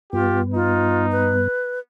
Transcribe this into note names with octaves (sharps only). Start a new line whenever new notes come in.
G2 B3 F4 G4
D#4 F4
B4